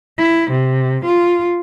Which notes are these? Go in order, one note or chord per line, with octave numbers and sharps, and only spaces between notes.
E4
C3
F4